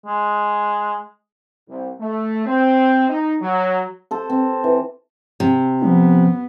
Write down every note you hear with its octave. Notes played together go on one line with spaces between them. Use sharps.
G#3
C2
A3
C4
D#4
F#3
A4 C5
C4
E3
C3
F3 B3